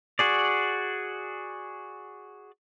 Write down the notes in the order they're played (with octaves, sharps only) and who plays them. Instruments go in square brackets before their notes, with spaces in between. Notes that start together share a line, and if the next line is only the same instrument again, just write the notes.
[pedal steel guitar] F#4 G#4 D5